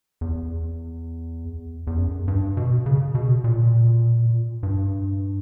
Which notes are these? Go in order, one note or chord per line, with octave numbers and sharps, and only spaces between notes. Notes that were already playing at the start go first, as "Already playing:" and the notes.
E2
E2
F#2
G2
B2
C#3
B2
A#2
G2